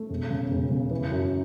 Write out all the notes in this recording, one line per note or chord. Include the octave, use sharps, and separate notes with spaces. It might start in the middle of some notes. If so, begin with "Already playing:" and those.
Already playing: A3
E1
C#3
E1
C#3
E3
F#2